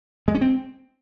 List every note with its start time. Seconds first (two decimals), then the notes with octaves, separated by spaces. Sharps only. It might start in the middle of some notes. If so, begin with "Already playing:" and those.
0.28 G#3
0.35 C#4
0.41 C4